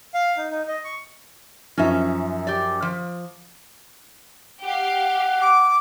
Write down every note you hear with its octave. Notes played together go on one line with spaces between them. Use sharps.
F5
D#4
D#4
D#5
C#6
F#2 F3 C#4 D#4 E5
G4 D5
F3
G4 F5 F#5
D6